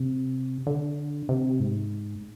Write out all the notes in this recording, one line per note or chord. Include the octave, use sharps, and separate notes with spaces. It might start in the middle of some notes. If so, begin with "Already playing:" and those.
Already playing: C3
D3
C3
G#2